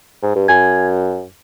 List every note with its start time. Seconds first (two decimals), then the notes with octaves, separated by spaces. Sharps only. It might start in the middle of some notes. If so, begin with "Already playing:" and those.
0.23 G#2
0.36 G2
0.48 F#2 G#5 G#6